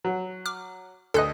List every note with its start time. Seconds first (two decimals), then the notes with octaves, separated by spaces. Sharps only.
0.04 F#3
0.46 D6 F6
1.14 D2 A4 D#5 F#6